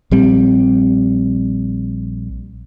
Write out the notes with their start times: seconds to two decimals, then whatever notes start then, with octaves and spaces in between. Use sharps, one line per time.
0.11 A#1 G3 C4